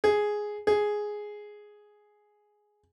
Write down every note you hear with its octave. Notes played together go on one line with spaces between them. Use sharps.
G#4
G#4